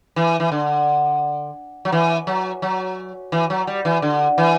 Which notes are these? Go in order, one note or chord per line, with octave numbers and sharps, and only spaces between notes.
E3
E3
D3
F#3
E3
F#3
F#3
E3
F#3
G3
E3
D3
E3